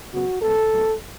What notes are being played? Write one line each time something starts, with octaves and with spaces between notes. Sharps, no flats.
C#3 F#3 B3 F#4
C#3 G#3 B3 A4
A2 F#3 B3